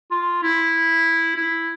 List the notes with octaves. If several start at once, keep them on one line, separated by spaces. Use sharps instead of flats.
F4
E4
E4